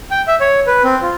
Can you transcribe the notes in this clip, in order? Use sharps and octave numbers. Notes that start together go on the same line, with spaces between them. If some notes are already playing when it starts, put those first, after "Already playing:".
G5
E5
C#5
B4
C4
F4